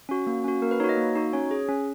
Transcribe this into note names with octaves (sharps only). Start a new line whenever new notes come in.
C#4 F#4
A#3
C#4 F#4
A#3 A#4
B4
D#4 F#4 C#5
D#5
A#3
D#4 F#4
C#4 C#5
G#4
C#4